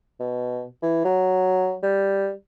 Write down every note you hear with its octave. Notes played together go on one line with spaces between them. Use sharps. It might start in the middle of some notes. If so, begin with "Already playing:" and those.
B2
E3
F#3
G3